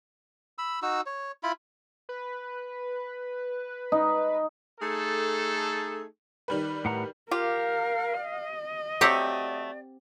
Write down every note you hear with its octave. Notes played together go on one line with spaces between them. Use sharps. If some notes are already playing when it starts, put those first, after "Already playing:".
B5 E6
D#4 F#4 E6
C#5
E4 F4 B5
B4
D#4
A3 D#4 G#4 A4
D#3 G3 B4
A2 F#5 A#5
F4 G4 A#4 F5
D#5
F#3 A3 C4 G4 D5 F#5